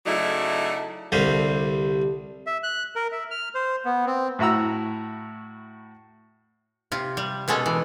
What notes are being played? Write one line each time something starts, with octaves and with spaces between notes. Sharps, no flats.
C#3 F#3 A3 D#4 E4 D5
C2 D3 G3 C4 G4 F5
E5
F#6
A#4
E5
F6
C5
B3
C4
A2 E4 F#4 A#5 E6
C3 F4
G3
B2 G#3 C#4 A4
E3